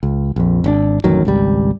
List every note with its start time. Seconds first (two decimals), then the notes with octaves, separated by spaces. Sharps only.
0.03 C#2
0.36 A#1 F2
0.64 G#1 C#4 D4
1.04 A1 F2 D#3 F#3
1.25 G#1 C#2 G3